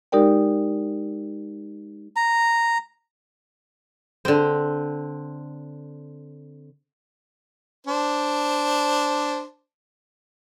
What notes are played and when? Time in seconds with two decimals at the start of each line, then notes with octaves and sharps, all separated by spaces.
0.12 G#3 D#4 G4 A#4 D5 G5
2.16 A#5
4.25 D3 C4
7.87 D4 C5